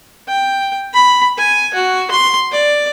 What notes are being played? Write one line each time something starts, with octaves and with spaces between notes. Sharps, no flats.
G5
B5
G#5
F#4
C6
D5